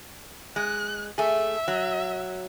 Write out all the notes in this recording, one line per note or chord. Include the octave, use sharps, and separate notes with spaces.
G#3 F#6
A3 G#4 E5
F#3